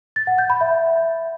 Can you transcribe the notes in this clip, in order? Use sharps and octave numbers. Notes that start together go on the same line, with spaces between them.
A6
F#5
G6
B5
E5